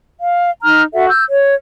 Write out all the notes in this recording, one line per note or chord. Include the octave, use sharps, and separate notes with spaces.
F5
D#4 A#5 F6
F#4 A4 E5 F#5
E6 G6
C#5